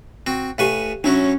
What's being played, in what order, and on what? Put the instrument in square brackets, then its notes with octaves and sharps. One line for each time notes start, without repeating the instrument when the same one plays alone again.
[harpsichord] C4 F#4
[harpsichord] A2 B4 G#5 [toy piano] G4 F5
[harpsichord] F#3 E4 F#4 [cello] C#4 [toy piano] D4